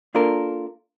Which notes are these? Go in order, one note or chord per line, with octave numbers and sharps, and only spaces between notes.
A#3 D4 F4 A4 A#4